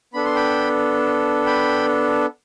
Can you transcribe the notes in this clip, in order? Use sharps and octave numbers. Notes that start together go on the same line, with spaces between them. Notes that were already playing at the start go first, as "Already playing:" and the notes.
B3 D4 A4 B5
C6
G5 B5
G5 B5